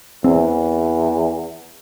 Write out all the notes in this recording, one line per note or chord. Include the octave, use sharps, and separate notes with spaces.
E2 C4